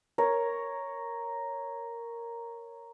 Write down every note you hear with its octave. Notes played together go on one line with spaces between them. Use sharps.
A#4 C#5